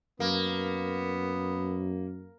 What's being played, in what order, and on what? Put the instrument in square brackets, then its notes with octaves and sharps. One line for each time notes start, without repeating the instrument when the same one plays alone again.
[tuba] F#2 [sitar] A#3 [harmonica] B3